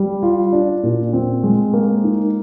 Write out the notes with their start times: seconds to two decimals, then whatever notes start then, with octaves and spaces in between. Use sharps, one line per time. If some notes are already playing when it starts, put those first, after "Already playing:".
Already playing: G3
0.23 F4
0.53 D4
0.84 A#2
1.13 C4
1.44 G#3
1.73 A#3
2.04 D#4